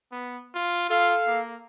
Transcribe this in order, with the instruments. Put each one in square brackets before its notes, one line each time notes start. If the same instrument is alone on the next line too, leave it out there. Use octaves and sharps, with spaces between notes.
[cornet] B3
F4
[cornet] F4 [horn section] A4 F5
[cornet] A#3